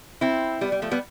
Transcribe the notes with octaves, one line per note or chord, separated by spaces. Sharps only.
C4 E4
G3 B3
G3
F3 A3
G3 B3